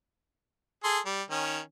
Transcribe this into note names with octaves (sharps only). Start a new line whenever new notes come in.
G#4 A4 C6
G3
D#3 C#4